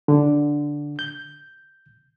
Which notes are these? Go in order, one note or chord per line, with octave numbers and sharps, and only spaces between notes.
D3
G6